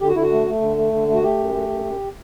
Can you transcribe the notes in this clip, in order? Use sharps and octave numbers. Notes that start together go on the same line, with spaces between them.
D3 G4
F#4
D3 E4
F#4
A3
A3
D3
A3
D3
A3
F#4
A3 G4
F#2
A3
F#2
F#2